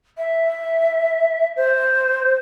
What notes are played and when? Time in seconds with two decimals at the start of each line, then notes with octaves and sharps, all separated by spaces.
0.18 E5
1.56 C5